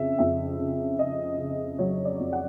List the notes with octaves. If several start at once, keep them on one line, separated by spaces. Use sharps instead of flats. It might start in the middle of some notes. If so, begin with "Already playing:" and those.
Already playing: F2 C#3 E5
F2 E5
C#3
C#3 D#5
C#3
F#3 C#5
D5
F2
F#5